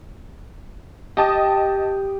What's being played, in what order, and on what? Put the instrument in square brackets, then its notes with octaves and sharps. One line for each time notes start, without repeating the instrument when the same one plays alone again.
[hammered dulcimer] G4 [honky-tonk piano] D#5 A5 D#6